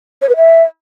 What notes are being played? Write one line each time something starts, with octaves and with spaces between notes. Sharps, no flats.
C#5
B4
E5